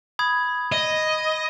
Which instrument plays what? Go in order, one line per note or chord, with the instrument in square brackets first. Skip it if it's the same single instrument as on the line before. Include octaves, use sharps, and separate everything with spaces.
[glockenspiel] B5 D#6 G#6
[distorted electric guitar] D#5